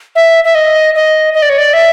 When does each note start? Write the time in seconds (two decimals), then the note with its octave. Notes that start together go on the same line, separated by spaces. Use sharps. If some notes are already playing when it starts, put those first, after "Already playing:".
0.16 E5
0.44 E5
0.55 D#5
0.95 D#5
1.34 D#5
1.42 D5
1.50 C#5
1.58 D5
1.73 E5